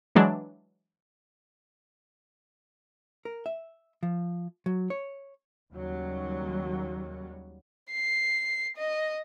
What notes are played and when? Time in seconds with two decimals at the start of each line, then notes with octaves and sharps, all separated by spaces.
0.15 E3 F#3 G#3 D4
3.25 A#4
3.46 E5
4.03 F3
4.66 F#3
4.90 C#5
5.71 D#2 C#3 F#3 G3
7.91 C7
8.77 D#5